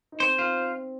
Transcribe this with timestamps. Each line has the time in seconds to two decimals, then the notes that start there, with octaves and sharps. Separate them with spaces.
0.12 D#4
0.20 C4 C5
0.39 C4 F4